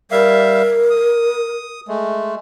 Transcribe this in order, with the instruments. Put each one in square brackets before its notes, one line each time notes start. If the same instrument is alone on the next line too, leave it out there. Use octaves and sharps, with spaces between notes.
[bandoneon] G3 E5 F5 [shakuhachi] A#4
[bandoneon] D#6
G#3 A3